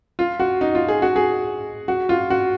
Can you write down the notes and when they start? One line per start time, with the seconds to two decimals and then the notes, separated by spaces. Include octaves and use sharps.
0.19 F4
0.40 F#4
0.61 D#4
0.75 F4
0.88 G#4
1.02 F#4
1.16 G#4
1.88 F#4
2.09 F4
2.30 F#4